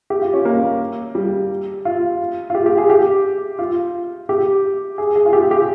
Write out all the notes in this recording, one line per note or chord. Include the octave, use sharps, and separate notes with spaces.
G4
F4
C#4
A#3
G3
F4
F4
G4
G4
G#4
G4
F4
G4
G#4
G#4
F4
G4
G4